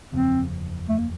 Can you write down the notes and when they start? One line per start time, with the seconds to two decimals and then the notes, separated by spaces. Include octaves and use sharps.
0.12 F#1 E2 C#3 F3 C4
0.89 A3
0.98 A#3